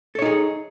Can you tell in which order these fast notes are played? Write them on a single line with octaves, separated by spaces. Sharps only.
A4 C#5 D#4 G#4